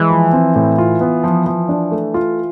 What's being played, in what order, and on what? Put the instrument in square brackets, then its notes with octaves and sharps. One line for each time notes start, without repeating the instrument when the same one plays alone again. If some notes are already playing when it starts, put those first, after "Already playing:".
Already playing: [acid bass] E3 [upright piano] G#3
[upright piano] F3
C4
A2
F4
B3
F3
F3
D4
A3
F4